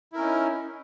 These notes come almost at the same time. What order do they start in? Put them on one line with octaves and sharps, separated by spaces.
E4 A#4 C#4 D#4